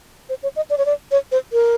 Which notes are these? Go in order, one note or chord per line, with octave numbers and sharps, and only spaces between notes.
C5
C#5
D#5
D5
C#5
D5
C#5
C5
A#4